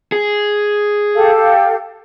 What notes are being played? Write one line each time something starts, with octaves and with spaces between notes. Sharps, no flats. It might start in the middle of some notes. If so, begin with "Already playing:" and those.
G#4
G4 A4 F5